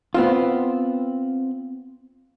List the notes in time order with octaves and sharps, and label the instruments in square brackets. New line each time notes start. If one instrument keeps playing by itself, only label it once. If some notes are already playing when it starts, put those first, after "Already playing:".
[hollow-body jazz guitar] B3 C4 F4